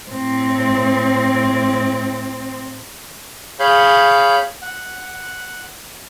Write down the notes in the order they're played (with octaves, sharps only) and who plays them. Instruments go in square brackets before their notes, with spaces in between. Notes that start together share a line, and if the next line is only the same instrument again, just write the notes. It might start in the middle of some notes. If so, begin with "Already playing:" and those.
[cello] A2 C4
[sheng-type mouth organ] G#4 C#5 F5 B5 G6
F#5